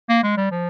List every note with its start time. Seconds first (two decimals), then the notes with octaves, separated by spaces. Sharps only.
0.09 A#3
0.23 G#3
0.37 G3
0.51 F3